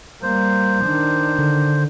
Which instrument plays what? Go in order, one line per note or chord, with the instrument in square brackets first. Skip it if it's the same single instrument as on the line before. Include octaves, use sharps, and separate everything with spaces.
[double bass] G3 A#3 [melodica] C5
[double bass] D#3 D4
[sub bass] D3